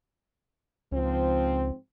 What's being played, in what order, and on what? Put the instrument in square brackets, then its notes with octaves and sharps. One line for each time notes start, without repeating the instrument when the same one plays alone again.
[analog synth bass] C#2 [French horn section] G#2 F3 C4